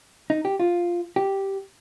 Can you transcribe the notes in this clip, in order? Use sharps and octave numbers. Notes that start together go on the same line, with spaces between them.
D#4
G4
F4
G4